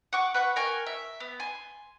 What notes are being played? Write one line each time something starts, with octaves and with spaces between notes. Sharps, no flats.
F#5 C#6 D6
B4 F#5 C#6
A#4 G5 G#5 C#6
E5
B3
G#5 C6